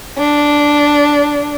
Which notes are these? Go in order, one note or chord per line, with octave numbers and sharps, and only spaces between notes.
D4